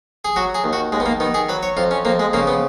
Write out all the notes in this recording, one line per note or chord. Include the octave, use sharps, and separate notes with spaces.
G#4
F#3 F#4
G#4
D#2
F#4
D#2 G#3
B3
A#3
D#3 B3
G#4
F#3 B4
C#5
F2 F4
C#4
F2 A#3
G#3
C#3 A#3
B3